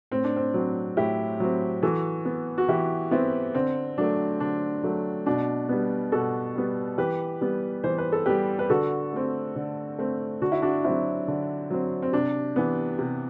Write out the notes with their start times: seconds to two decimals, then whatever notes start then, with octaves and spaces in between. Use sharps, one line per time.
0.11 A2 C4
0.24 D4
0.36 C4
0.54 F#3 C4
0.97 A2 E4 G4
1.40 F#3 C4
1.83 E3 F#4 A4
2.25 B3
2.58 F#4
2.68 E3 E4 G4
3.11 B3 C4 E4
3.55 D3 C4
3.98 F#3 A3 D4
4.40 D3 D4
4.83 F#3 A3
5.26 B2 D4
5.69 G3 B3
6.12 B2 F#4 A4
6.55 G3 B3
6.98 E3 G4 B4
7.41 G3 B3
7.84 E3 C5
7.98 B4
8.12 A4
8.26 G3 B3 G4 B4
8.59 B4
8.70 D3 F#4 A4
9.13 A3 C4
9.56 D3
9.98 A3 C4
10.42 D3 F#4
10.52 E4
10.62 D4 F#4
10.84 F#3 C4 E4
11.28 D3
11.70 F#3 C4
12.02 C4
12.13 C3 D4
12.56 E3 B3
12.99 C3